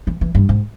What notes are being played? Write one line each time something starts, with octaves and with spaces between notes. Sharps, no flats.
E3
E3
G2
G#2